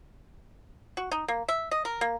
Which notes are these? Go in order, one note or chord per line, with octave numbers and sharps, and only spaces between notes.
F#4
D#4
A#3
E5
D#5
A#4
A#3